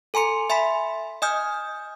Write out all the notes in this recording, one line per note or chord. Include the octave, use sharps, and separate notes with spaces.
A4 G#5 A#5 C6 C#7
E5 G#5 B5 C6 B6
D#5 G#5 D#6 F6 G6